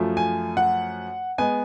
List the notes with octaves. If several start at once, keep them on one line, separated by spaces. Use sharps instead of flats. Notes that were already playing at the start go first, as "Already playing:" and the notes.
Already playing: F#2 F3 A3
G#5
F#5
G#3 B3 G#5